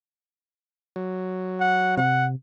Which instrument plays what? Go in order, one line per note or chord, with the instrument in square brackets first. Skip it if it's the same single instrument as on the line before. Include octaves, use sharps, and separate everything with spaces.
[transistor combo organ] F#3
[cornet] F#5
[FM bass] C3 [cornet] F#5